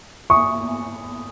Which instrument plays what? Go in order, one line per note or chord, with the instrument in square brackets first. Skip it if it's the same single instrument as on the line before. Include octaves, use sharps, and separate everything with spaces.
[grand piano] C#6 D#6